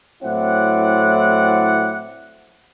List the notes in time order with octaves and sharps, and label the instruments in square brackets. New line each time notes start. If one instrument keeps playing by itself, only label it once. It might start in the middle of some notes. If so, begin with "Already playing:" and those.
[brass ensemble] A2 F#3 C4 E4 D5 F#5